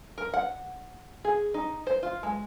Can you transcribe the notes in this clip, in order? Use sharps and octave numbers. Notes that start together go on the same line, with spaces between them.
A#4
F#5
G#4
D#4
C5
F4
G#3